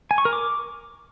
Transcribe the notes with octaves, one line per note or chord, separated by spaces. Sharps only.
G#5
C#6
A#4
D6